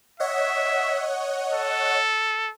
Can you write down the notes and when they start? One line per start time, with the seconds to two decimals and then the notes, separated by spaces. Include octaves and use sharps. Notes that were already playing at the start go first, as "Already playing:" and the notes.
0.20 C#5 D#5 E5 F#5
1.52 A4